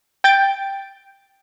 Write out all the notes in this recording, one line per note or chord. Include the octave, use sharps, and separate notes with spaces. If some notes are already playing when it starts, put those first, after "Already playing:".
G5 G6 A6 D7